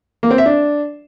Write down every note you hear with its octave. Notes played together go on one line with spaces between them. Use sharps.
A#3
C4
E5
D4